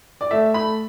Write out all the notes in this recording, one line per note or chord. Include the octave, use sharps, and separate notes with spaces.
D5
A3 E5
A3 B5